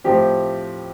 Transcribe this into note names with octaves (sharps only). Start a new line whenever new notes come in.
A2 F3 C4 G4